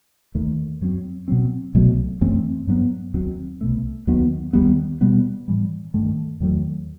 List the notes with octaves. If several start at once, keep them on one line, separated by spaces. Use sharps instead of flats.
D#2 D#3 A3
F#2 F#3 C4
B2 F#3 C4
C2 B2 F#3 A3
F#2 E3 A3 C4
G2 F#3 B3
D#2 D#3 F#3 C4
C2 B2 A3
D#2 D#3 F#3 B3
D#2 D#3 G3 B3
B2 G3 B3
A2 E3 G3
G2 D#3 A3
E2 D#3 F#3 A3